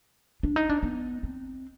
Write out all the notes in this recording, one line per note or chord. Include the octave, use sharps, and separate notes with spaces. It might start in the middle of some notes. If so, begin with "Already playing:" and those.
D4
D#4
D4
B3
C4